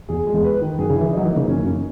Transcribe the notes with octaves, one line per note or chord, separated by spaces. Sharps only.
E2 G#4
G#3
E2
B4
D#3
F#2 G#4
C#3
E4
E3
F#3 D#4
E3
A#3
C#3
F#2 C#4
F#2
C#4